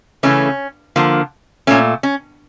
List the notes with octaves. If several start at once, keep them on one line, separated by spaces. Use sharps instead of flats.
C#3 E3 A3 C#4
D3 F3 A#3
A#2 A3 C#4
C#4